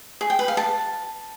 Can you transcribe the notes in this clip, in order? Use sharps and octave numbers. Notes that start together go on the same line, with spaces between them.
G#4
G5
B4
F5
A5